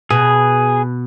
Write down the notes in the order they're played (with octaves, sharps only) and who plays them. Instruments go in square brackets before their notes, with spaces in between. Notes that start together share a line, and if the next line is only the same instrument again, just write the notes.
[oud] B2 [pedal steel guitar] G#4